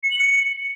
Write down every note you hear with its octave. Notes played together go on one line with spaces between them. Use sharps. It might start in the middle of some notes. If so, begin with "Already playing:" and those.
C#7
F#7
C#7